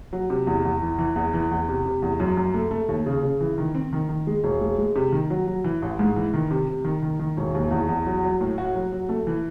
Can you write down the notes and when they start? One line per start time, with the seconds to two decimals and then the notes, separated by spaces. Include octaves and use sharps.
0.13 F#3
0.30 C3
0.47 E2
0.65 E2
0.82 E3
0.99 E3
1.16 E2
1.33 E3
1.51 E2
1.69 C3
1.86 C3
2.02 E2
2.20 F#2
2.37 F#2
2.54 A3
2.71 A3
2.89 D#2
3.06 C#3
3.23 C#3
3.41 E3
3.58 D#3
3.75 C4
3.93 D#3
4.09 D#3
4.27 G#3
4.44 E1
4.61 G#3
4.78 G#3
4.96 C3
5.13 D#3
5.30 F#3
5.47 F#3
5.64 E3
5.82 A1
5.99 G#2
6.16 E3
6.34 D#3
6.51 C3
6.68 C3
6.85 D#3
7.03 D#3
7.19 D#3
7.37 E1
7.54 D#2
7.71 E2
7.89 E2
8.06 F#3
8.24 F#3
8.41 A2
8.58 F#4
8.75 F#3
8.92 F#3
9.09 A3
9.27 E3